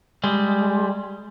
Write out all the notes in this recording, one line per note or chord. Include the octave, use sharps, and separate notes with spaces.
G3 G#3